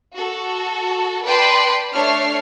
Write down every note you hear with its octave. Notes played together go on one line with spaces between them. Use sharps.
F#4 A4
B4 D5 G5 A5 B5 C6
A3 D4 C#5 F6 C7